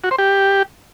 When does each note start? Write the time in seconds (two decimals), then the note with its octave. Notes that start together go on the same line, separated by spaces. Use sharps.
0.04 F#4
0.11 C5
0.18 G4